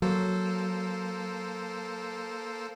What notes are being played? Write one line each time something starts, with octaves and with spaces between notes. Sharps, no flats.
F#3 A#3 A4 C5